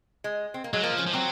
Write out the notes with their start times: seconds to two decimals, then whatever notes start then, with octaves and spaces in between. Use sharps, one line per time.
0.24 G#3
0.54 C4
0.64 A#3
0.73 F#3 G#3
0.83 F3 A#3
0.98 C#4
1.07 F3
1.13 F#3 C4